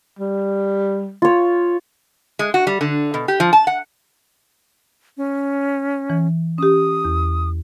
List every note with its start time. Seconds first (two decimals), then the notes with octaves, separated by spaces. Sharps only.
0.19 G3
1.22 F4 C#5
2.39 G#3
2.54 F#4
2.67 G3
2.81 D3
3.14 B2
3.28 G4
3.40 F3
3.53 A5
3.67 F#5
5.17 C#4
6.10 E3
6.58 C#4 G4 D#6
7.05 E2